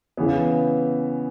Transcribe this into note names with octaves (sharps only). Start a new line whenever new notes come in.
C#3 E3 B3